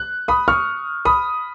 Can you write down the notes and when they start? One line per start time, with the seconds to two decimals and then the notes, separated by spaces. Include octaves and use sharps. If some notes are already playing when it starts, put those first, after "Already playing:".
Already playing: F#6
0.28 B5 D#6
0.48 C#6 F6
1.05 B5 D#6